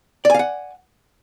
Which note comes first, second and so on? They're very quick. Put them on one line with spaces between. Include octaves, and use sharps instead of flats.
D5 G#5 F5 F#5